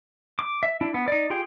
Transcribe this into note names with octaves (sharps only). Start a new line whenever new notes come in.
D6
E5
D4 E4
B3
D#4 D5
F4 G4 G#4 G5